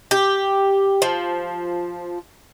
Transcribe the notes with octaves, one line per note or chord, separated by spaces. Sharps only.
G4
F3